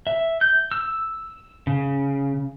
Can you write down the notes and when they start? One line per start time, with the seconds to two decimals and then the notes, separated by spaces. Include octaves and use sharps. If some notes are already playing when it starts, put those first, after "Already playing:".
0.07 E5
0.41 G6
0.72 E6
1.67 C#3